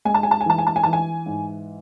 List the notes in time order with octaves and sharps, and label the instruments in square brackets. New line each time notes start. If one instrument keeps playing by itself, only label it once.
[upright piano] G#3 G#5
A5
G#5
A5
G#5
E3 A5
G#5
A5
G#5
E3 A5
G#5
G#2